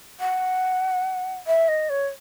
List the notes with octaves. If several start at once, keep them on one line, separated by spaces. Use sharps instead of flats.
F#5
E5
D#5
C#5